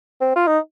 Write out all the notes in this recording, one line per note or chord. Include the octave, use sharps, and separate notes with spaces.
C4
F4
D#4